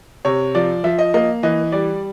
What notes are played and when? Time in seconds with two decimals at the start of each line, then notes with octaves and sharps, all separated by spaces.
0.25 C3 C#5
0.55 F3 D5
0.84 F3 E5
0.99 D#5
1.14 A#3 D#5
1.43 E3 D#5
1.72 G3 D5